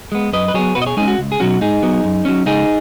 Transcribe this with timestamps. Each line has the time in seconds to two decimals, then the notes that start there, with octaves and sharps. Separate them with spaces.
0.12 G#3 B3
0.33 F#2 B4 D#5
0.48 B4
0.54 F#3 B3 G#4 C#5
0.75 B2 F#4 B4
0.82 D#5
0.86 G#4 C#5
0.97 G#3 C#4 D#4 G#4
1.08 F#4
1.18 C#2
1.32 G#4
1.40 B2 F#3 C#4 F#4
1.61 G#2 D#4 G#4
1.83 F#3 B3
2.04 F#2
2.25 F#3 C#4
2.46 C#2 D#4 G#4